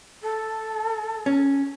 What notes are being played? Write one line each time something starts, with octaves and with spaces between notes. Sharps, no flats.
A4
C#4